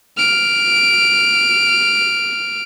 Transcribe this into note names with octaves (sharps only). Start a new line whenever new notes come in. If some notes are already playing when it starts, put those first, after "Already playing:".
F6 D7